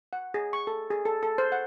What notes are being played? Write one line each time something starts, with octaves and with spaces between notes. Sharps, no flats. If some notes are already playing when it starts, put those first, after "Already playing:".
F#5
G#4
C#6
A4
G#4
A4
A4
C5
F#5